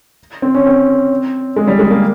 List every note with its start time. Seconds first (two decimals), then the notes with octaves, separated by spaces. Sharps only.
0.42 C4
0.55 C#4
0.66 C4
1.56 G#3
1.67 G3
1.79 G#3
1.90 A#3